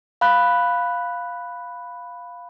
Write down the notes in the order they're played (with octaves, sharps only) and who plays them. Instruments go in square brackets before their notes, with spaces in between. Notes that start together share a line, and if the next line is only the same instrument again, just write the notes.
[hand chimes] F5 B5 F#6